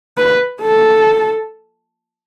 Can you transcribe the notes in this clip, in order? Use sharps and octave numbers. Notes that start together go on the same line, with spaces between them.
B4
A4